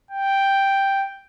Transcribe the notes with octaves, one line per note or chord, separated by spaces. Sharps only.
G5